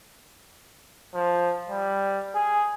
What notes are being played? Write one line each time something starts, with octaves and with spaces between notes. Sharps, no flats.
F3
G3
G#4